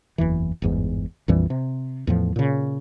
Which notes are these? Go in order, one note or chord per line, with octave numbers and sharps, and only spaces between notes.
F#1 E2 E3
G1 E2 G#2
A#1 F2 E3 G3
C3
E2 A2 F3
A#2 C#3